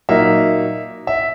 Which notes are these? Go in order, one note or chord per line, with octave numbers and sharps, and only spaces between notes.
A#2 F#3 A#3 D#4 E5
E5